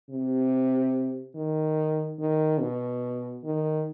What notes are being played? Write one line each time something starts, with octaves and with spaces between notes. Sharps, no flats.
C3
D#3
D#3
B2
D#3